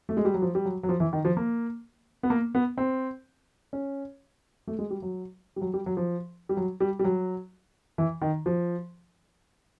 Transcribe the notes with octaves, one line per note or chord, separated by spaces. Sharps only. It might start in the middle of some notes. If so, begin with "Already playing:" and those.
A3
G#3
G3
F#3
F3
G3
F#3
F#3
F3
E3
D#3
F3
A#3
B3
A#3
B3
C4
C#4
A3
G#3
G3
F#3
G3
F#3
G3
F#3
F3
G3
F#3
G3
G3
F#3
E3
D#3
F3